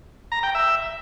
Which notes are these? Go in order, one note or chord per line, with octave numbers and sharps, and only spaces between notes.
A#5
G5
E5